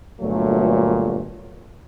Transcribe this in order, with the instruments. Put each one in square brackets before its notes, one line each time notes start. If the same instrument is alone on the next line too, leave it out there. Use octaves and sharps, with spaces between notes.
[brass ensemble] G1 A#2 F#3 A3